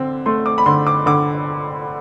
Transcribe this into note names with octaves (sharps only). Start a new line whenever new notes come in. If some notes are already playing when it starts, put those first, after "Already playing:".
Already playing: D3 C4
A3 C6
D6
B5
D3 C6
D6
D3 D6